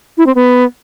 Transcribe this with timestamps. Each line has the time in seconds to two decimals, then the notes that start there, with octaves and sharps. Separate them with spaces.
0.18 E4
0.26 C4
0.35 B3